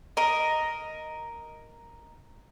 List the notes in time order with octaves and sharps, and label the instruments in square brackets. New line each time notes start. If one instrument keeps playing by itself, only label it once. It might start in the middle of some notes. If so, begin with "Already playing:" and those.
[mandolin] A#4 D#5